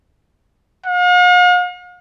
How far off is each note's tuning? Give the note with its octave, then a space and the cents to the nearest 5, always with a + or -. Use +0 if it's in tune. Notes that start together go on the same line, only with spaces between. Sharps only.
F5 +45